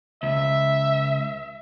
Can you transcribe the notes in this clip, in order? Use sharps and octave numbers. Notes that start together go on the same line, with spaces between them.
C#2 E5